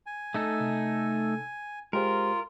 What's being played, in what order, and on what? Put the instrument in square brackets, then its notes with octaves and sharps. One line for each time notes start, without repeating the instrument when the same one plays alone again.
[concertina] G#5
[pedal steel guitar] A3 D#4 A4
[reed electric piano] C3
[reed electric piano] G#3 G4 C5 [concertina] F4 [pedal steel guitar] A#4